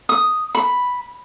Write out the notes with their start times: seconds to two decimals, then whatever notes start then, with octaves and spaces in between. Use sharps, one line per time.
0.09 D#6
0.55 B5